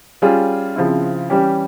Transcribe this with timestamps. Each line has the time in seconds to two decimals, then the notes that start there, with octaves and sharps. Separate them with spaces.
0.22 G3 C#4 F4 G#4
0.76 C#3 F3 C4 E4
1.30 E3 G3 C#4 G4